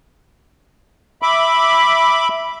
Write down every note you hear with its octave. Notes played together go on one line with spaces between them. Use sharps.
E5 B5 D6